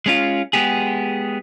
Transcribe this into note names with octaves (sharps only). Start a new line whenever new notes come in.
G#3 C#4 F4
G#3 B3 G4 G#4